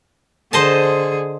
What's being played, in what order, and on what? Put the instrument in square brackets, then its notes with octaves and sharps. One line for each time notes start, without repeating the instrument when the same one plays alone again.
[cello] D3 G#4 [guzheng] C5 D#5 A5